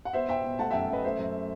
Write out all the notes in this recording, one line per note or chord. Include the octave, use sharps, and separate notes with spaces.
F#5
B3 C5 E5
B2 E5 G5
B2
A3 F#5 A5
F#2 E5 G5
F#2 B4 D#5
A3 C5 E5
F#2